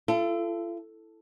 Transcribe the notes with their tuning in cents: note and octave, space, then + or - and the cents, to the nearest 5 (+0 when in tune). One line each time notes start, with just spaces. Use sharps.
F4 -45 A4 +0